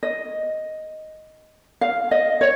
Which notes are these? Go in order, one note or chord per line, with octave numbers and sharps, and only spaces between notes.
D#5
F5
D#5
C#5